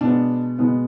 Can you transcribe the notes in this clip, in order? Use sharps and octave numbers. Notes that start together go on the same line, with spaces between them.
B2 G#3 B3 D4
B2 G#3 B3